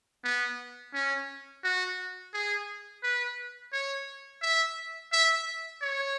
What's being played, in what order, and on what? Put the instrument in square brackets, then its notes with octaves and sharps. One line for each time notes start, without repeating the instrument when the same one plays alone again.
[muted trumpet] B3
C#4
F#4
G#4
B4
C#5
E5
E5
C#5